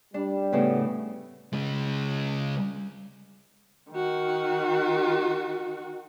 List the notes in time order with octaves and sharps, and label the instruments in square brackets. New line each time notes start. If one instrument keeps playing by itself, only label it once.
[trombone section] G3 [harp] D4
[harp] A2 C#3 [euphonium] B3
[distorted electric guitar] C#3 G#3
[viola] D#3 F#4